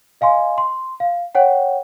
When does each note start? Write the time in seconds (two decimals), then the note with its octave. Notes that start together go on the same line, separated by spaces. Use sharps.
0.21 D#5 F5 G#5 C6
0.58 C6
1.00 F5
1.35 C#5 F#5 G5